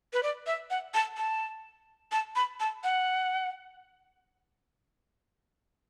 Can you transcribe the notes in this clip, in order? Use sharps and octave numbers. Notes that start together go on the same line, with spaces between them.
B4
D5
E5
F#5
A5
A5
A5
B5
A5
F#5